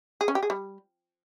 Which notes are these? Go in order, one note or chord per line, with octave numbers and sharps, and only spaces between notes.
G#4
C#4
G4
G#4
G3